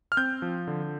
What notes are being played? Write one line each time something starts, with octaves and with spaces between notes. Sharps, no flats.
F6
C4 G6
F3
D3